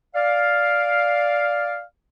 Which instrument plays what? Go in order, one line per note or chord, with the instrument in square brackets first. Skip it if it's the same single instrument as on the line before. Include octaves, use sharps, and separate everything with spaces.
[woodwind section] D5 F5